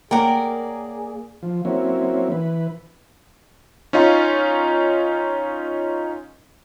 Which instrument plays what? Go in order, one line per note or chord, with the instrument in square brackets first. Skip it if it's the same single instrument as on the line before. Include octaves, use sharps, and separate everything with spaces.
[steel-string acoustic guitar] A#3 D5 [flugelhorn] G#4 [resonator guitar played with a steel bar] A#4 [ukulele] C#5 F#5 G5
[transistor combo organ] F3
F#3 A#3 C4 C#4 E4
E3 B4
[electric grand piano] C#4 D#4 F4